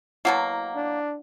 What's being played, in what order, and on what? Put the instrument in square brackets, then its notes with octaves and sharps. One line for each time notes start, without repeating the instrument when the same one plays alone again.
[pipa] B2 F#3 A#3 [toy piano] E4 F#5 A#5
[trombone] D4